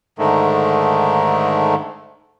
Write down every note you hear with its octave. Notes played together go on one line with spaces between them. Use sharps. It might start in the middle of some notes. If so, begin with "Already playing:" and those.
G#2 D3 D#3 A3